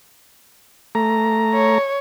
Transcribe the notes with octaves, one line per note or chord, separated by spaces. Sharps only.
A3 A#5
C#5